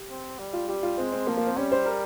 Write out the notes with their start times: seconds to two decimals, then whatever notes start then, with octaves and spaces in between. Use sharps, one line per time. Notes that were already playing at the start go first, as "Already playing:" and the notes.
Already playing: G4
0.10 C4
0.39 G3
0.53 F4
0.68 G3 G4
0.83 F4
0.98 G#3 C4
1.12 C4
1.27 F3 A#3
1.37 A#3
1.47 C4
1.56 G3 C#4
1.72 C5
1.86 A#4